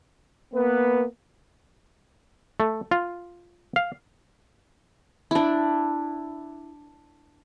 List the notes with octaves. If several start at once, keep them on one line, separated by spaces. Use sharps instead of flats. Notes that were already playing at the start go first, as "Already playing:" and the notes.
A#3 B3 B4
A3
F4
F5
D4 E4